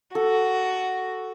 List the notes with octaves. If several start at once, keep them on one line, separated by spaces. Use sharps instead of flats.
F#4 A4